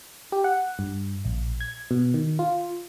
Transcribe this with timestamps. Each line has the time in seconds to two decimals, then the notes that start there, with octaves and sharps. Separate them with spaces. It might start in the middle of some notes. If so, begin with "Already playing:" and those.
0.32 G4
0.44 F#5
0.79 G2
1.25 A#1
1.61 G#6
1.91 B2
2.14 D#3
2.39 F4